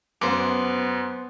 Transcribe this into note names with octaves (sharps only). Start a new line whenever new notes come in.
F#2 B3 C5 D6